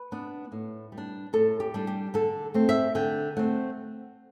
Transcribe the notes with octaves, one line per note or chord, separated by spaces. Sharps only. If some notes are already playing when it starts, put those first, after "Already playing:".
Already playing: B4
B3 D4
A2
G3
D4
A2 A4
G4
G3 D4
G4
D3 A4
A3 C4
E5
D3 G5
A3 C4 F#5